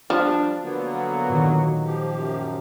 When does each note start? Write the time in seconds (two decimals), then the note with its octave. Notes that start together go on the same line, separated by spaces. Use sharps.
0.10 F3 G3 D4 F6
0.63 D3 F#3 A#3 B3
1.29 A#2 D#3
1.84 F3 G4
2.16 F#2